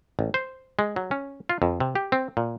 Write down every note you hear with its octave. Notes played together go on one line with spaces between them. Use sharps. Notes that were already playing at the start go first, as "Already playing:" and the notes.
A1
C5
G#3
F#3
C#4
F4
F2
C3
G4
C4
A#2